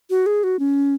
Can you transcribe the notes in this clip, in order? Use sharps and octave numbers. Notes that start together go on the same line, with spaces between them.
F#4
G#4
F#4
C#4